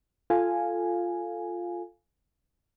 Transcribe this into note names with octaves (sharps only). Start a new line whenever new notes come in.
F4 A4 F5 G#5